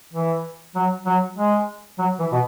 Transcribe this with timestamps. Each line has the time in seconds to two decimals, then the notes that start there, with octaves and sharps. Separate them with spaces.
0.13 E3
0.75 F#3
1.06 F#3
1.37 G#3
1.99 F#3
2.19 E3
2.32 B2